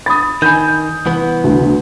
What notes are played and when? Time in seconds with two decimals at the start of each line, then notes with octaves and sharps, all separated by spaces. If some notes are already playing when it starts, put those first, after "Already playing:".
0.06 B5 D#6 A6
0.42 D#3 G#5 B5 G6
0.68 G6
1.06 C2 E3 B3 F#5
1.44 D2